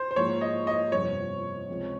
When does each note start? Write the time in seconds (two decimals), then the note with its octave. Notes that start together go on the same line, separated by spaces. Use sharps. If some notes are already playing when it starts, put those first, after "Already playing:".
Already playing: C5
0.11 C5
0.16 G#2 F3 A#3 C#5
0.41 D#5
0.67 D#5
0.92 G1 F2 C3 C#5
1.68 C#2 C3 F3 C4